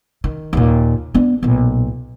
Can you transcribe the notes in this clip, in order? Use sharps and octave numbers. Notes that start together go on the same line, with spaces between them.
D#3
D#2 A#2
B3 D4
B1 A#2